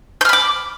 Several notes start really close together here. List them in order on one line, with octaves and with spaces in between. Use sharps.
G6 F6 B5 D6